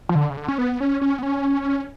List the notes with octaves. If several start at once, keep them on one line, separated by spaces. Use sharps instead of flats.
F3
D3
C#3
D3
C#4
B3
C#4
C#4
B3
C#4